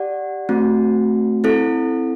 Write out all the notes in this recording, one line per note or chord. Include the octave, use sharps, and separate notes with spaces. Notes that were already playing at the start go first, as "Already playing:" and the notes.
Already playing: G4 D5 F#5
A3 C4 F#4
C4 E4 A4